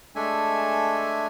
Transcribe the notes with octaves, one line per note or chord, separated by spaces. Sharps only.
G#3 A3 D4 A4 E5 G#5